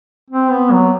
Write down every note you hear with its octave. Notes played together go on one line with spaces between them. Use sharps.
C4
B3
F#3